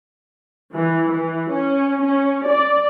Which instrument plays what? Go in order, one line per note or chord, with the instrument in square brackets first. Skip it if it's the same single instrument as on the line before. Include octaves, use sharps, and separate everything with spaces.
[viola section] E3
E3
C#4
C#4
D5